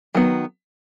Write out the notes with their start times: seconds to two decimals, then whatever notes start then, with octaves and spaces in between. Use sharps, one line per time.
0.14 D#3 F#3 B3